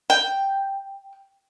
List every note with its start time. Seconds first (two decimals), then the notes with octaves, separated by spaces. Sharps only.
0.10 G5